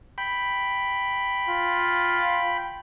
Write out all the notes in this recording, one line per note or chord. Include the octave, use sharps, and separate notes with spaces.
G5 B5
F4